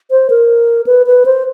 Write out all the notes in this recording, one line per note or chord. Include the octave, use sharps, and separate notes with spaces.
C5
A#4
B4
B4
C5